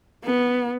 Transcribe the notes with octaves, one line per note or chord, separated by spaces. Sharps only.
B3